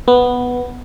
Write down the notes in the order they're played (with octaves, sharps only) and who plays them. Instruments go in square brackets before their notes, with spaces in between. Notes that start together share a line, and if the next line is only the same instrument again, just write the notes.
[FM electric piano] B3